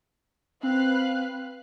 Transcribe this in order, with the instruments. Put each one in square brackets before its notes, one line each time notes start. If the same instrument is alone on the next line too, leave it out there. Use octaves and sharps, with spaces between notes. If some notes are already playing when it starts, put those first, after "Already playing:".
[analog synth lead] C4 [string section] B4 F5 F#6